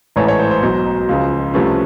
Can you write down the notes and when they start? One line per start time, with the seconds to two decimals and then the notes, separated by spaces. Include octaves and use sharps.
0.16 A1 G#2 E3 A3 C#5
0.28 C#5
0.39 C5
0.51 C5
0.62 B1 B2 F#3
1.09 C#2 C#3 F3
1.54 C2 C3 F3 A3 C#4 B4